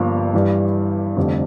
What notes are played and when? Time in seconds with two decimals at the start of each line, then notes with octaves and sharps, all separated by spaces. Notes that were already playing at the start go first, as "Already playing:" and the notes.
Already playing: G1 G2 F3 A#3
0.34 G2 E3 G3
1.17 F1 F2 D3 G3